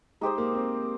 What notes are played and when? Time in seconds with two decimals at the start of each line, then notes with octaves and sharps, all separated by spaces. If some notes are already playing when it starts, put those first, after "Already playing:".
0.21 G#3 D#4 G4 C5 D#5
0.38 A#3
0.54 C4